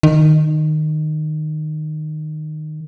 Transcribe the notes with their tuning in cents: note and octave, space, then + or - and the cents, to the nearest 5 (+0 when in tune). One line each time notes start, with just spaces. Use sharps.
D#3 -15